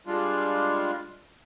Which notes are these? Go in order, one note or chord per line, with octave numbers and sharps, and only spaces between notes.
G3 G#3 D4 F4